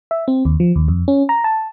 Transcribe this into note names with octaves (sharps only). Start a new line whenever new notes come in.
E5
C4
D#2
F3
D#2
F2
C#4
A#5
A5